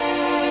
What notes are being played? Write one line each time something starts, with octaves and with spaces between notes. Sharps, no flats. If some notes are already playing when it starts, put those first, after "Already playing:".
Already playing: B3 D4 F4 A#4